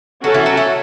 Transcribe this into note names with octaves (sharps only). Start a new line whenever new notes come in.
F#3 C#4 F#4 A4
E3
F#3
A3